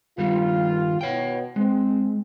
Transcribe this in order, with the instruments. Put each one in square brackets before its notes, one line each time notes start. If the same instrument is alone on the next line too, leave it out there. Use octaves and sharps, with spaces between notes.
[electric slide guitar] G2 D#3 G3 [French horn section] F4
[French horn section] B2 [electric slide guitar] C#5 G5
[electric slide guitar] G#3 [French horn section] C4